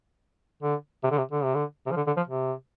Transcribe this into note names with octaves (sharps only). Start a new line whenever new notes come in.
D3
C3
D3
C3
D3
C3
D3
C3
F3
D3
D3
F3
C3